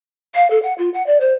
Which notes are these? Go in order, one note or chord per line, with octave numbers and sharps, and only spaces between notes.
F5
A4
F#5
F4
F#5
D5
C5